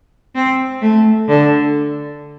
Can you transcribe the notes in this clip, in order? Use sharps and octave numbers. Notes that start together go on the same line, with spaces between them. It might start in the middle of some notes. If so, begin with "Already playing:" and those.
C4
A3
D3